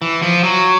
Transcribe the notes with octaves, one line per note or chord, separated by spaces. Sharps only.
E3
F3
F#3